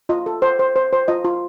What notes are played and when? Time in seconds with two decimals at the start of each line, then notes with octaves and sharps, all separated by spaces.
0.09 F4 D#5
0.26 A4
0.42 C5
0.59 C5
0.76 C5
0.93 C5
1.08 F4 D#5
1.24 F4